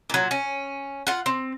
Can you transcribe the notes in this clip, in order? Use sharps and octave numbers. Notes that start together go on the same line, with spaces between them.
A#2 F#3
C#4
F4 F#5
C4